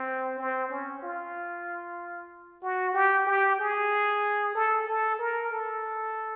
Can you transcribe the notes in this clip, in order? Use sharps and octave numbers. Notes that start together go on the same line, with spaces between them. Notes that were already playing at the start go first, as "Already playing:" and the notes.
Already playing: C4
C4
C#4
F4
F#4
G4
G4
G#4
A4
A4
A#4
A4